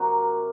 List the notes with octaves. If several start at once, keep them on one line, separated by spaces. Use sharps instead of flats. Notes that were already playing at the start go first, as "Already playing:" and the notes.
Already playing: C3 F#3 F#4 A#4